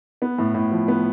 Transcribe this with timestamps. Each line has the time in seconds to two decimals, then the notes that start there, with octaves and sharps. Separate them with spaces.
0.22 B3
0.38 A2
0.54 A2
0.72 F3
0.88 B3